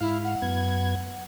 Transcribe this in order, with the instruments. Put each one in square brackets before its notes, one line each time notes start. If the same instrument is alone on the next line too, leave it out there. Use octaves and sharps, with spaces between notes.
[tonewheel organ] G#2 F5 [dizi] E4
[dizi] F#5
[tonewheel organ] F#2 B3 G#6